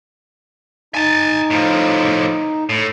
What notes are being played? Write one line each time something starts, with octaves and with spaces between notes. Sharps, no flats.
D#4 G#5 A5
A2 F3
A2